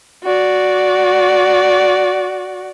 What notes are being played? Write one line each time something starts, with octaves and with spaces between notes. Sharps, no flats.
F#4 D5